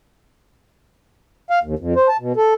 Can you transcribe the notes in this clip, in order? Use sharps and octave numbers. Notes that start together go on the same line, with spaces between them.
F5
D#2
F2
C5
A5
B2
A4